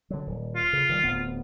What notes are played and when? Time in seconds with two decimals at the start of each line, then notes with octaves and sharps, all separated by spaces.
0.10 D3 F#3
0.27 D#1
0.56 F4
0.73 C#3
0.89 D#3 F#3 G3
1.03 D1 B3